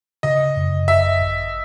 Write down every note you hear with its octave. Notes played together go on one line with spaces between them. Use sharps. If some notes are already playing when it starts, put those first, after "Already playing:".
C#3 D#5
F#2
G#1 E5
G#1